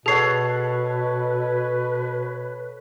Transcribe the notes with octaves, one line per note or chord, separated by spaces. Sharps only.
B2 G#4 A4 B4 C#5 F#5 C7